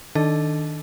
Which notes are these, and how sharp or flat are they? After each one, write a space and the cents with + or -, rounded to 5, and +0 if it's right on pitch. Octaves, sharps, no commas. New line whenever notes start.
D#3 +0 D4 +0 A4 +5